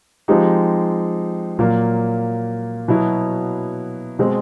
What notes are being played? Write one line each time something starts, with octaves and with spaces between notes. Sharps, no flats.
F3 G#3 C4 D#4 G4
A#2 F#3 A#3
B2 F#3 B3 E4
B2 G#3 C4